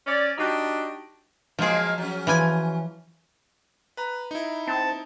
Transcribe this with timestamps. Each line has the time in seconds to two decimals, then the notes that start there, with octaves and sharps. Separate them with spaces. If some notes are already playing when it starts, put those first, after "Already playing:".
0.07 C#4 D5
0.38 D4 D#4 F#4 G4
1.59 F3 F#3 G#3 A#3 G#4
1.98 F#3 C#4
2.27 E3 F3 G#5
3.97 B4 A#5
4.31 D#4 E4
4.68 C4 A5